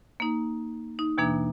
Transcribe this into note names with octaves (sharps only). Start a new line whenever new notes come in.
A#3 D#4
D#4
D#2 B2 E3 A#3 D4